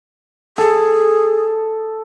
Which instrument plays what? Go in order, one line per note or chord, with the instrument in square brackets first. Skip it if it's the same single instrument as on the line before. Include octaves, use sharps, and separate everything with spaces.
[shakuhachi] G#4 [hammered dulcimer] A4